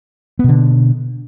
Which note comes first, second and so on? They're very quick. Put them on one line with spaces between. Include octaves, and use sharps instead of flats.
B3 B2 D3